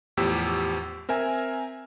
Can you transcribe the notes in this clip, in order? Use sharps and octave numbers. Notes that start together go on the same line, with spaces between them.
E2 A2 F3 G4 E6 B6
C4 A#4 E5 G#5